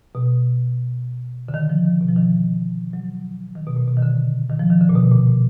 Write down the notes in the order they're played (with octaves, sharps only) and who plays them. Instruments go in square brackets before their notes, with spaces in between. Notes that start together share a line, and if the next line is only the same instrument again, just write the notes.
[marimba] B2
D3
D#3
F3
D#3
B2
F3
D#3
F#3
D#3
B2
A#2
B2
D#3
D3
D#3
F3
D#3
D3
A#2
B2
A#2
A#2